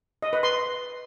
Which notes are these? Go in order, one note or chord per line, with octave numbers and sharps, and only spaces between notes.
D#5
B4
C6